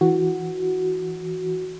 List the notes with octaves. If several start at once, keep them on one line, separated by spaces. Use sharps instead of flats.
E3 F#4